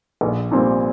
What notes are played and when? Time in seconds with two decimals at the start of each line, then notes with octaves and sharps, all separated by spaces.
0.21 A#1
0.51 A#2 G3 C4